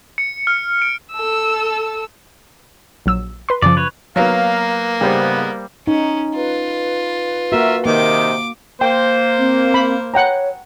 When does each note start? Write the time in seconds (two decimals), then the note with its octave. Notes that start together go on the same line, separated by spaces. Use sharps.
0.18 C#7
0.47 F6
0.82 D7
1.12 A4 E6
3.06 A#1 F#3 E6
3.49 B4 C6
3.62 F#2 C#3 F3 D5
3.77 B4 C#5
4.16 F#3 A#3 B3 F5 A#5
5.01 G#2 C#3 G3 B3 C5
5.87 C#4 D#4
6.36 F4 B4
7.52 A#3 F#4 A#4 E5
7.86 C3 D#3 A#3 D6
8.81 A#3 C5 G5
9.39 C4
9.74 B5
10.14 C#5 F#5 G5 A#5